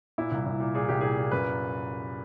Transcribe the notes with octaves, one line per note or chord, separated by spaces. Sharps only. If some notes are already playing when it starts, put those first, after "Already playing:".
A#2 E4
C2
C2
A#2
A#2 G#4
C2 G4
A#2 G#4
A#2
F#2 B4